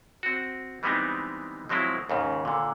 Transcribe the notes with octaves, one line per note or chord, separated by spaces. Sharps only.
C4 F#4
E3 G3 G#3 B3 C4 D#4
F3 F#3 G#3 C4 E4
D#2 G#2 C#3
A#2 D3